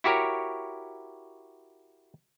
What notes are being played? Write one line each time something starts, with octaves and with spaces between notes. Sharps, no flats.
E4 F#4 G4 A#4 C#5